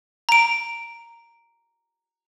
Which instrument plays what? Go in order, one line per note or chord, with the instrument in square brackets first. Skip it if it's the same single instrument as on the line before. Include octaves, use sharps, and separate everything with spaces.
[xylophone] A#5 D7